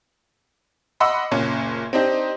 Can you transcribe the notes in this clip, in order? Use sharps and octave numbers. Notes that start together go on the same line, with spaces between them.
D#5 F#5 B5 C6 D6 E6
F#1 A#2 C#4
C4 D4 D#4 G4 C5